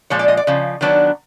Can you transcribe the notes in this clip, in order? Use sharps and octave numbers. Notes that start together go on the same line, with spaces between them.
A#2 F3 G#3 C#5
D5
D#5
D5
C#3 F3
D#3 F#3 B3 D4 D5